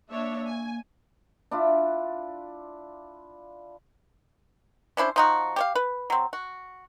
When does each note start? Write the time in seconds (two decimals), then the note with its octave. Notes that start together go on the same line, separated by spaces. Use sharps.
0.10 A#3 D4 C#5 E5
0.47 G#5
1.51 D4 E4 F4
4.97 C#4 D4 E4 C5
5.16 F3 D#4 F#4
5.56 G4 C#5 F5
5.75 B4
6.10 F#3 C4
6.33 F#4